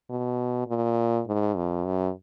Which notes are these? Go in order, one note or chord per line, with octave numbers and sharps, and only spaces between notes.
B2
A#2
G#2
F2
F#2